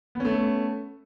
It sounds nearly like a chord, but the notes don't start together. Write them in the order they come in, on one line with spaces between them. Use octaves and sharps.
B3 C#4 A3